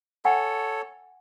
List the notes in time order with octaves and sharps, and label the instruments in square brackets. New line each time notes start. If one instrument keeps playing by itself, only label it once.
[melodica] A4 C#5 [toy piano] F#5 G#5